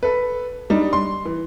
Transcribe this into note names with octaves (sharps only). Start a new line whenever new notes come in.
A4 B4
G3 D4 D#4
C6
E3